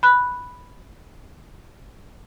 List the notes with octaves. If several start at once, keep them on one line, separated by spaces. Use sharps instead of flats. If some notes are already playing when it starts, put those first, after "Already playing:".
B5 F#6